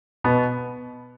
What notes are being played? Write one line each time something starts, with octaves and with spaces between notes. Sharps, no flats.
B2 B3